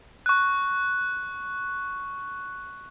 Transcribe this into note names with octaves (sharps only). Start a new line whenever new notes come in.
C#6 F#6